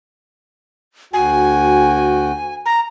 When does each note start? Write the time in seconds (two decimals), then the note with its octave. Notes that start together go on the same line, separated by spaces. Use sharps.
1.13 D2 F#4 G5 G#5
2.66 A#5